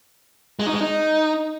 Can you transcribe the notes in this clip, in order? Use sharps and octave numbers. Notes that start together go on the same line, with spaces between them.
G#3
D#4
G#3
D#4